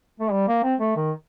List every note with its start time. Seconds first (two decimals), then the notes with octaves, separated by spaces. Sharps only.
0.20 A3
0.32 G3
0.48 A#3
0.64 C4
0.80 A3
0.96 D#3